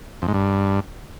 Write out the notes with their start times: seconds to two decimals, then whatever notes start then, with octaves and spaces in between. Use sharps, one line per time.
0.22 F2
0.28 G#2
0.34 G2